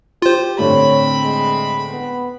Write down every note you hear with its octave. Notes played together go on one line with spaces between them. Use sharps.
F4 G4 C5
A2 D3 C4 C#5 B5
G#3
B3